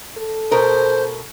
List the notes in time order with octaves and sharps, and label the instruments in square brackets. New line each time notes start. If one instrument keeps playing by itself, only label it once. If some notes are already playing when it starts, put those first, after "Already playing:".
[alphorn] A4
[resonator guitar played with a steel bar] B2 A#4 [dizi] C5